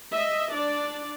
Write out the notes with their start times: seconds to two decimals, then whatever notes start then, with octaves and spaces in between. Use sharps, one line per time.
0.11 D#5 E5
0.52 D4 D5